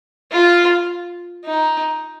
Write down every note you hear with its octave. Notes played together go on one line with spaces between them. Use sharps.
F4
D#4